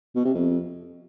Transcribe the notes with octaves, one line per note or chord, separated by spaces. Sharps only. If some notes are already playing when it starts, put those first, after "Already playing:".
B2
C3
F2